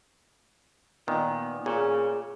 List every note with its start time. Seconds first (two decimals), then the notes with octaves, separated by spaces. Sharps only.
1.08 A#2 D#3 B3
1.66 A#2 G#4 C#5